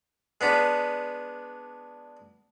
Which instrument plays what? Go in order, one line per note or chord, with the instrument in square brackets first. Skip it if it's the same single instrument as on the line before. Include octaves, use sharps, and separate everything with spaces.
[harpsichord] G#3 B3 D4